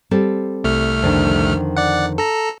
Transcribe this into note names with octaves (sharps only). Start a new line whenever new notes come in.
G3 C4 A4
C2 A3 F6
F2 D3 D#3
D5 F#5
A4 A#5